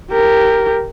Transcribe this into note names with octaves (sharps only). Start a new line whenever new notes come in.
G4 A#4